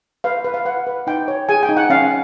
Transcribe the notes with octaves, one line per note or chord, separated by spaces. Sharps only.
B4 F5
B4
F5
B4 F#5
B4
D#4 G5
C#5
G#4 G#5
G5
D#4
F#5
C#4 F5